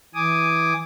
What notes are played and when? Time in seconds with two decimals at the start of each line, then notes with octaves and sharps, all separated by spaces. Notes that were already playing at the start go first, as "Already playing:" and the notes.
0.14 E3 G#5 D6 D#6